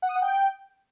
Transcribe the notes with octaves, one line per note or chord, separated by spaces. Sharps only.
F#5
D#6
F#5
G5